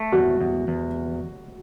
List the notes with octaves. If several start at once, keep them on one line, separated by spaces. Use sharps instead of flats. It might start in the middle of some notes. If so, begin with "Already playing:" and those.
Already playing: A3
E2 F#4
E2
E2